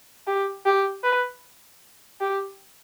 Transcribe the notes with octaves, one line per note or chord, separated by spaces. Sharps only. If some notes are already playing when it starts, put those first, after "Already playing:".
G4
G4
B4
G4